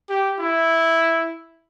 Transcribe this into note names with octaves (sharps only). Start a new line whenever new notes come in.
G4
E4